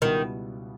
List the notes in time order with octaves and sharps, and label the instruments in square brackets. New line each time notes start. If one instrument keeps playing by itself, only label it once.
[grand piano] C#2 B2 G3 B3 E4 [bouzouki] D#3